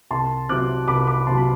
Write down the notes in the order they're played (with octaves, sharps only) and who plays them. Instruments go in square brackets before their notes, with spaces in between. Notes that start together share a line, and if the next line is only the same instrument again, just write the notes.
[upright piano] C2 A5 C6
C3 F#3 D6 F#6
C2 B5 D6
B5 D6
C3 F#3 A5 C6
B5